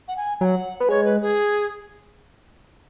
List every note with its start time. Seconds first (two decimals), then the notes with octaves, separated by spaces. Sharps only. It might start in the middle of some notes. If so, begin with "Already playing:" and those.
0.08 F#5
0.17 G#5
0.41 F#3 F#5 G#5
0.80 B3
0.89 G#3 C#5
1.05 B4
1.21 G#4